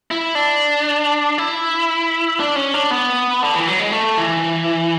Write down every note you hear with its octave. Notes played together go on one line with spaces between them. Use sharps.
E4
D4
E4
D4
C#4
D4
B3
D3
E3
F#3
G#3
A3
E3